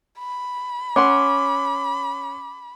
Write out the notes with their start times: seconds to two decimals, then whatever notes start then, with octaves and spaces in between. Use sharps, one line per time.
0.19 B5
0.96 C#4 F#5 C6 D6